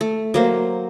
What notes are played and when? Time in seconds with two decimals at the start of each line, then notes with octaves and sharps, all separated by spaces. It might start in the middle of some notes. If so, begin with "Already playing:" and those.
0.01 A3
0.34 F#3 A#3 C5